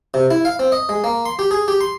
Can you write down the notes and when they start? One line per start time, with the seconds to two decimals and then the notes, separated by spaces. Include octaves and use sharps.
0.14 C3
0.30 E4
0.45 F5
0.59 C4
0.72 D#5
0.89 G#3
1.04 A#3
1.26 C6
1.39 G4
1.51 G#4
1.68 G4
1.81 C6